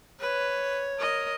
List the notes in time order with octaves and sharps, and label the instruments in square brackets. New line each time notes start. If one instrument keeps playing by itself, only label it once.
[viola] B4 [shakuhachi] C#5
[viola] A#4 D#5